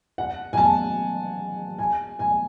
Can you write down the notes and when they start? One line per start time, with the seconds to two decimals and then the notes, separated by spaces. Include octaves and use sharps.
0.18 F#5
0.53 G#5
0.57 A5
1.78 G#5
2.19 G#5